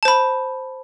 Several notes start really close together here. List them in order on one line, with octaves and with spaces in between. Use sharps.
A5 C5 B5